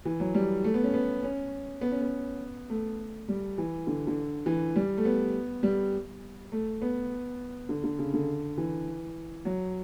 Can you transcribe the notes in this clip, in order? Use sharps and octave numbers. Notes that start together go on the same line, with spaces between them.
E3
F#3
G3
A3
B3
C#4
B3
C#4
B3
C#4
B3
A3
G3
E3
D3
D3
E3
G3
A3
B3
G3
A3
B3
D3
D3
C#3
D3
E3
F#3